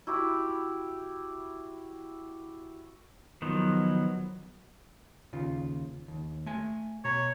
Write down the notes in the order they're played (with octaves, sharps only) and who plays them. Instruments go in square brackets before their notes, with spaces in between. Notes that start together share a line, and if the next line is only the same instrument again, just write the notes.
[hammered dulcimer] E4 F#4 G4 B5
[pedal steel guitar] D#3 F3 B3 [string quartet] F#3
[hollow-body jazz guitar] D#2 C#3 F4
D#2
A3 G#5
[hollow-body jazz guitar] B2 A#5 [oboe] C#5